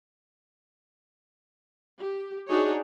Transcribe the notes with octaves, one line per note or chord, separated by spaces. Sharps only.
G4
D4 D#4 F#4 G#4 C#5